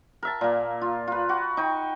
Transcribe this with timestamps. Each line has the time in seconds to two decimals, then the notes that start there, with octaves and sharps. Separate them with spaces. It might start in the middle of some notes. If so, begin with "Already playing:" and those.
0.23 A#4 E5 A5
0.41 A#2 A#3
0.81 F4
1.07 F4 B4
1.29 F#4
1.57 D#4 G5 C#6